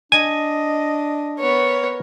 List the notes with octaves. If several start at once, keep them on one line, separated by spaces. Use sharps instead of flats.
D4 D#5 G#5
B3 A#4 C#5